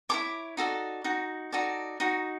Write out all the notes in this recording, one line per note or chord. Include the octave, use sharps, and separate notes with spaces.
E4 A4 C#5 D6
D#4 F#4 A4 D5
D#4 F#4
D#4 F#4 A4 D5
D#4 F#4